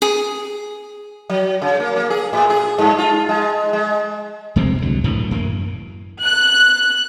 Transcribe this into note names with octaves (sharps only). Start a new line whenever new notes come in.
G#4
F#3
C#3
A#3
A#3
G#4
A2
G#4
G2
F4
G#3
G#3
F2 C3 G#3 C4
C2 D3 F#3
F#2 A2 D3 E3
F#2 E3 A#3
F#6